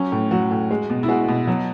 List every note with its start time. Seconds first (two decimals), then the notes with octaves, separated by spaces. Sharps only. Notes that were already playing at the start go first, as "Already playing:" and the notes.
Already playing: F#3 C#4
0.12 A2
0.31 F#3 F#4
0.51 A2
0.71 G#3
0.90 B2
1.03 E4
1.08 G#3 F#4
1.28 B2
1.47 F#3